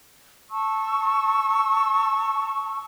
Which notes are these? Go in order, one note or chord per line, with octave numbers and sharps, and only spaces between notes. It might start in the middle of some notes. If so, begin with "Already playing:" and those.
A5 C#6 E6